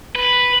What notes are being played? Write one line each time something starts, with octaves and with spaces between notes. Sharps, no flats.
B4